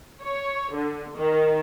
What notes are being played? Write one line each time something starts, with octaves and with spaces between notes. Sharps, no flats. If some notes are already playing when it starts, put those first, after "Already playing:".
C#5
D3
D#3